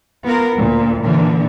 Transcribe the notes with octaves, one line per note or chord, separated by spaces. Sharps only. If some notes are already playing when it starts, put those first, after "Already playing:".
B3 F4 A#4
D2 A#2
A#2 D3 E3